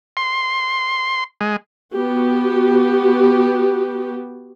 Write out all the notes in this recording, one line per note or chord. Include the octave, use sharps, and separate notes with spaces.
C6
G#3
B3 F#4 G4